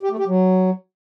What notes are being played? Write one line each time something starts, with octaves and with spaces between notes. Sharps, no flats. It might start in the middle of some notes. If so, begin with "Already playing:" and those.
G4
A3
G4
F#3